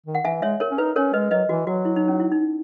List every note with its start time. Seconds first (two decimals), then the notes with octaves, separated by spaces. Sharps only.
0.07 D#3
0.15 F#5
0.25 E3 E5 G#5
0.42 G#3 C#5 E5
0.60 A#4 C#5
0.71 C#4
0.78 D#4 B4
0.96 C#4 A#4 C#5
1.13 G#3 B4 D#5
1.31 F#3 B4 D#5
1.49 E3 F#4
1.67 F#3 F#4
1.85 E4
1.96 D#4
2.08 C#4
2.20 E4
2.32 D#4